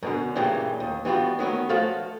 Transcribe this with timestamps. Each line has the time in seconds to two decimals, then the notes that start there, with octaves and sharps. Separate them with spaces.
0.03 F#2 B2 D3
0.35 G2 A#2 C#3 E3 G3
0.80 D#2
1.05 E3 G3 B3 F4 F#4
1.39 D#3 F#3 B3 C#4
1.69 F3 A3 F4 F#4 A4 F5